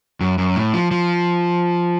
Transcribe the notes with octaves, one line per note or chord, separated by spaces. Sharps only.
F#2
F#2
A2
F3
F3